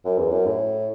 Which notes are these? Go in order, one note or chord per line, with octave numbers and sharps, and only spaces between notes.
F#2
E2
F#2
A2